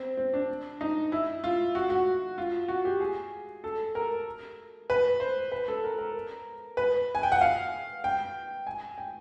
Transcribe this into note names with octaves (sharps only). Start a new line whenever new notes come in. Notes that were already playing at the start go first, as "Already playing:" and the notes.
Already playing: C4
C4
D4
D#4
E4
F4
F#4
F#4
F4
F#4
G4
G#4
A4
A#4
B4
C5
B4
A4
A#4
A#4
B4
G#5
G5
F#5
F5
G5
G#5
G5